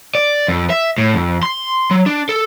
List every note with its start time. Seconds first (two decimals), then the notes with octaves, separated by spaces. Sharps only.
0.15 D5
0.48 F2
0.70 E5
0.98 A2
1.14 F2
1.43 C6
1.91 F#3
2.06 D4
2.29 A4